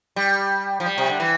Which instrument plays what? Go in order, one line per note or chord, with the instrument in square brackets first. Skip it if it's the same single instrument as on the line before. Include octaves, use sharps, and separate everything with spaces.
[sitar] G3
F3
G3
C3
D3
E3